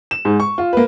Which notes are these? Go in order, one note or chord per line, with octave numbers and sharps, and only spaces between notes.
E7
G#2
C#6
F4
A#3 B4